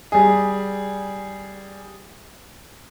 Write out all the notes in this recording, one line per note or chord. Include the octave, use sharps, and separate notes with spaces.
G3 G#4